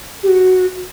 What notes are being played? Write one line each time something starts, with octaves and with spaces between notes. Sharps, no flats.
G4
F#4